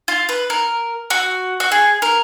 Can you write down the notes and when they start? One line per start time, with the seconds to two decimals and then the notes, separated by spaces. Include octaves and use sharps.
0.08 F4
0.29 B4
0.50 A#4
1.10 F#4
1.60 F#4
1.72 G#4
2.02 A#4